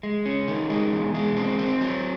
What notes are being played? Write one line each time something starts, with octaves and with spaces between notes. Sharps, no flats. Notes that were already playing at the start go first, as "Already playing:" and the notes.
G#3
C#4
D#3
G#3
E2
G#3
C4
C4
F#3